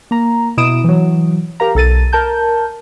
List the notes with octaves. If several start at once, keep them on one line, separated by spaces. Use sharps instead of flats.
A#3 A#5
B2 E4 D#6 D7 E7
E3 F#3
G4 A#4 F5 A#5
B1 A4 A6 D#7
A#4 A5 G6